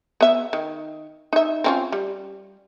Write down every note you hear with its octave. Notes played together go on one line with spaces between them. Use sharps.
B3 E5
D#3
D#4 E5
C4 C#4 F4
G3